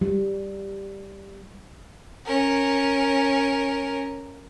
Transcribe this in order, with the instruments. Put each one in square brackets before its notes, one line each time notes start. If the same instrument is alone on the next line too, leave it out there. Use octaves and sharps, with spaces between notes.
[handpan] G3
[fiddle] C#4 A#4